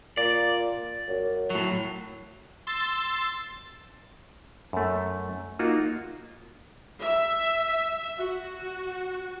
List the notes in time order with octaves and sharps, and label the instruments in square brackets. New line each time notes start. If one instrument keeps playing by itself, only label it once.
[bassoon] A#2 [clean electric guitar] D5
[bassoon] F#2
[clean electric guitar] A2 F#3
[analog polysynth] C6 E6 A6
[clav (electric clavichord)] F#2 A3
A#3 D#4 F4 F#4
[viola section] E5
F#4